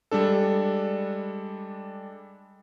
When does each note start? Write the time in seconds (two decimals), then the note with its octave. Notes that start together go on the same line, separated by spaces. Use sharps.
0.11 G3 G#3 D4 A4